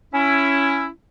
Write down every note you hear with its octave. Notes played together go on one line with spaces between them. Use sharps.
C#4 E4